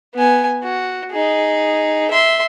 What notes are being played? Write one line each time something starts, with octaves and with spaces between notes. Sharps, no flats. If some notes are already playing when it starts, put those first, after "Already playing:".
B3 G#5
F#4
D#4 G#4
E5 C6